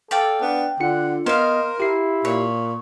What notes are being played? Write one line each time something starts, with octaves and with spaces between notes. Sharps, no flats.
A4 D5 F5 G5
B3 D4
D3 D4 F4 F#5 C#7
B3 A#4 C5 D#5 F5
E4 G4 C7
A#2 C#5